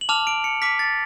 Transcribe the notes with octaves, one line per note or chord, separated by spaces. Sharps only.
F#7
A5 D6 F6 F7
D7
C#7
A5 D6 F6 B6
A6